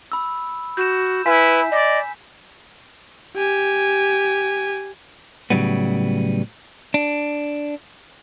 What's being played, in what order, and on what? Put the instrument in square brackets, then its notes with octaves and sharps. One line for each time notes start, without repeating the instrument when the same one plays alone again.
[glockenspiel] B5 E6
[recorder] F#4 [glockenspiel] G6 E7
[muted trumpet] E4 [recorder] B4 [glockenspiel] G#5 B6
[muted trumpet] D5 [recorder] D#5
[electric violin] G4 G#5
[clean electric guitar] A2 C#3 F#3 G3 B3
D4